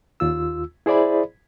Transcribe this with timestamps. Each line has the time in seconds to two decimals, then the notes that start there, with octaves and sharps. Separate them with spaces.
0.20 D#2 F4 E6
0.86 E4 G#4 C5 D5 E5 B5